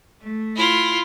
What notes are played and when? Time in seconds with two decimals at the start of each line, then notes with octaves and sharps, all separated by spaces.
0.20 A3
0.56 E4 F4